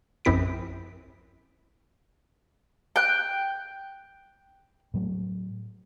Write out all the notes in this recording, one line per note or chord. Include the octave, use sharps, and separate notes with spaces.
A#1 F#2 C4 E4 B6 D7
G5 F#6
A2 F#3 A3